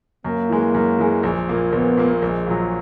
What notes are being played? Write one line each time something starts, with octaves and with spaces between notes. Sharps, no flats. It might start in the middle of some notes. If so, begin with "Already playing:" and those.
F#2 A#3
E3 G#3
F#2
E3 G#3
A#1
A#2 A#3
A#1 B3
A#2 A#3
A#1 G#3
A#2 F#3